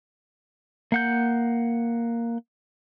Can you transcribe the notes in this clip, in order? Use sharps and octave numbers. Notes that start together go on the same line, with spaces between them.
A#3 F#5 G6